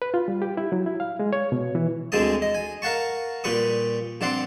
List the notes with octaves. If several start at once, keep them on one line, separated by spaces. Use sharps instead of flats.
B4
F4
G3
G4
E4
F#3
E4
F5
G#3
C#5
B2
E3
D2 G2 G#3 C4 A5 D#6
D#5
G#5
A#4 F5 F#5 A5 C#6
A#2 G3 B4 C#6 D#6
G2 C4 D5 F#5 C6